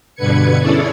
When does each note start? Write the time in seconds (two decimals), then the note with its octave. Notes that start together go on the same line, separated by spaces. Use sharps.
0.15 G2 B2 D3 B4 G#6 C#7
0.60 C#4 E4 G#4 A4 C#5 D5